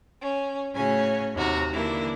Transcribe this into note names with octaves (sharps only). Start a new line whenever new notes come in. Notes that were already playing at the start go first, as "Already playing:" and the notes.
C#4
A2 C#3 C#4 F#4 C#5 G#5
D#2 C3 F#4 A#5
D3 E3 A#3 D4 E4